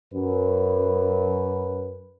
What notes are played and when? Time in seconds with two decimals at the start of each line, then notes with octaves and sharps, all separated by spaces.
0.13 F#2 B4